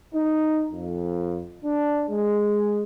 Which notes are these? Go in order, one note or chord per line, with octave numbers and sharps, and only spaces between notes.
D#4
F2
D4
G#3